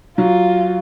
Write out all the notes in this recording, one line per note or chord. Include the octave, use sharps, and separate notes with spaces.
F#3 F4